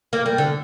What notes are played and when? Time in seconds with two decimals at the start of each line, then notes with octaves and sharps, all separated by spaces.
0.13 A#3
0.26 G3
0.38 D3